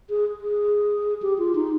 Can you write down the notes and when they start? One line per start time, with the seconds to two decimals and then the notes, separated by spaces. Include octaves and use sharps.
0.10 G#4
0.41 G#4
1.22 G4
1.38 F4
1.55 D#4